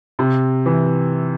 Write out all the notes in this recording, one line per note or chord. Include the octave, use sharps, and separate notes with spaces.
C3
E3